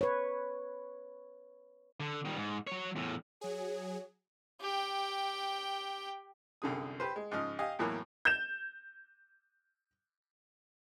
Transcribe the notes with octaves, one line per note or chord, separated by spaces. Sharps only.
B4 C#5
D3
D#3 G3
G#2
F#3 C#5
E2 A2
F#3 G#4 C#5
G4 G5
C2 F#2 D3 G#4 D#6
G4 B4 C5
G#3
G#2 C#3 F3 D#5 F6
G4 D#5 F5 G#5
E2 A2 E3 F#3 A#3
G6 E7